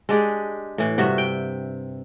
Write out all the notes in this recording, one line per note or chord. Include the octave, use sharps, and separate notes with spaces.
G#3 D4 G4 G#4
A2 E3
G2 C3 F#4 E5
G5